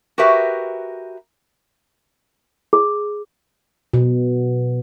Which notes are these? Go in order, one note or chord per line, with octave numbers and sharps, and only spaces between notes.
F#4 G4 A#4 B4 E5
G#4
B2